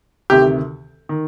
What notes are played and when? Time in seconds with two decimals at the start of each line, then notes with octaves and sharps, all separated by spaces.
0.30 D2 C3 D#3 G4
1.09 D#3